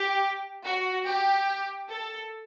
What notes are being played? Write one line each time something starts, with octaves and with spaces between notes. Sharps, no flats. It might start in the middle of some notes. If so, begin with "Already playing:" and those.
Already playing: G4
F#4
G4
A4